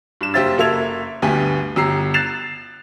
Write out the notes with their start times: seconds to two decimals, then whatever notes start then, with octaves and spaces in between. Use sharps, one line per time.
0.21 G2 E7
0.34 F#1 G4 C5 E5 F5 A6
0.58 F#1 A#3 A4 E5 G#6 F7
1.22 D2 G2 B3 G4 G#5
1.76 G1 G4 A#5 E6 C7
2.14 F#6 A6 C7 E7 F7